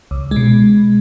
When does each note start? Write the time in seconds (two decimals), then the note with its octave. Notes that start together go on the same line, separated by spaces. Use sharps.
0.11 C#2
0.31 B2 G#3